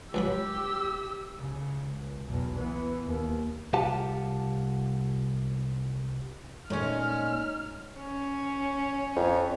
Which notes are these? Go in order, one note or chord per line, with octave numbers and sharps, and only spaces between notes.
C#2 F#3 G4 B5 E6
C#2 C#3
C#2
B1 E2
E3 B3
D#2
C2 F4 G4 F5 F#5 A5
A#2 G#3 A3 C#4 D#4 C#5 F6
C#4 C#5
F2